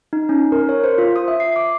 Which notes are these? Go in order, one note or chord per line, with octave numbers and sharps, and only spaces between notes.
D#4
C#4
A#4
C#5
C5
F4
D#6
E5
C7
D6